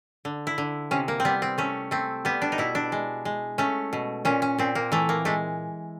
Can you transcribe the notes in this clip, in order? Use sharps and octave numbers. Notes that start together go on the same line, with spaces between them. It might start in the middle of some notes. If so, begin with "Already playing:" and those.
D3
E4
D3
C3 C#4
A#3
C4
G3 B3
C4
A3 C#4
A3 C4
G3 B3
D4
D#4
B2 E4
D4
G#3
G#3
A3 C#4
B2
A#2 C#4
C#4
A#2 C4
A#3
E3 A3
A#3
G#3 A3